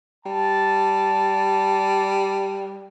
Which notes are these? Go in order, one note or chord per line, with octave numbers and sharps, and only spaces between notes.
G3 A5